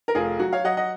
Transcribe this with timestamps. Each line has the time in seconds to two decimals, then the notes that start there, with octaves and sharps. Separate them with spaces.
0.08 A#4
0.15 F1 F4 G#4
0.39 F#3 F#4
0.53 C#5 F5
0.64 F#3 D#5 F#5
0.77 D#5 F#5